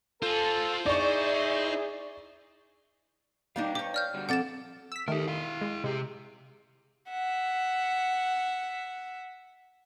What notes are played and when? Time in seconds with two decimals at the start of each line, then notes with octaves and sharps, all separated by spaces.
0.23 F4 A4 C5 G#5
0.86 D#4 E4 G#4 D5 C#6
3.56 G3 D4 D#4 B4 F5
3.75 G4 C#5 D6
3.94 D5 F6 G6
4.14 D3 G3 F#4
4.29 F2 C4 A4 D5 F#5 A6 E7
4.92 E6 B6
5.08 D#3 A3 G4 A#4
5.28 E4 F5
5.62 G#3
5.84 C3 G#3 G4
7.10 E5 F#5